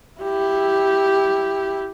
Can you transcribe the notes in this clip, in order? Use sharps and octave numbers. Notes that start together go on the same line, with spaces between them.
E4 G4